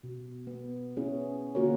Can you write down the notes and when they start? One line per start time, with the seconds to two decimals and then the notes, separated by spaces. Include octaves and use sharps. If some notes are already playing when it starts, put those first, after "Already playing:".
0.03 B2
0.47 B3
0.97 B3 C#4 E4 G#4
1.55 D3 A#3 F4 F#4 A#4 C#5